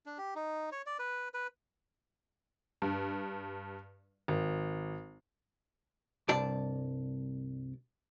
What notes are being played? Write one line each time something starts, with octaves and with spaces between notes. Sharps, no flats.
D4
G4
D#4
C#5
D5
B4
B4
G2
G#1
C2 G2 D5 A5